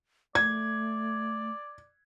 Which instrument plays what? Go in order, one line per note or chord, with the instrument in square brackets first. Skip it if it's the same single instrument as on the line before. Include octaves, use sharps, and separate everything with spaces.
[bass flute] A3 [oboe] D5 [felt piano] G#6